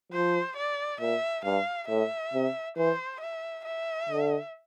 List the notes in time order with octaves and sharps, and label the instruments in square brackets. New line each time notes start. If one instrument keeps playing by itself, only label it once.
[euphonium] F3 [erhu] C5
[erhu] D5
[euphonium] A#2 [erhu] E5
[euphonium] G2 [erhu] F5
[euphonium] A2 [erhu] E5
[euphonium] C3
[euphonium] E3 [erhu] C5
[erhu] E5
E5
[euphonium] D3